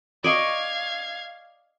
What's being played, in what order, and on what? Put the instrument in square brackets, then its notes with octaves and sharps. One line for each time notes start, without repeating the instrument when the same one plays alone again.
[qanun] D5 D#5 C#6 [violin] F5 G#6